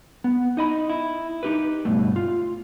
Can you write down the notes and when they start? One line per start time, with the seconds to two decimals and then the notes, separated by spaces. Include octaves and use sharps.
0.24 B3
0.57 D#4 D#5 B5
0.90 E4
1.43 D#4 G4 B4
1.85 C#2 G2 B2 A3
2.16 F4